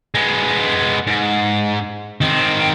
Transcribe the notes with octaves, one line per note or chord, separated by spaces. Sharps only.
G#3 B3
G#2
D#3 C4